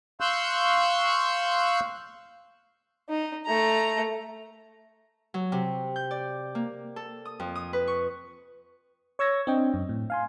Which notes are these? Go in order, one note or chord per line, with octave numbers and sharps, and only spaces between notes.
F5 C6 C#6 E6 F#6 G6
D#4
A3 A#5
F#3
C3
G6
D5
A#3
A4
D#6
F2
D#6
B4
C#6
C#5 C#6 E6 G#6 A#6
C4 D4 D#5 G5
F#2
A2
F5 G#5 C6